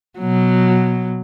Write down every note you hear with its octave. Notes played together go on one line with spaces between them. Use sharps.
B2 F#3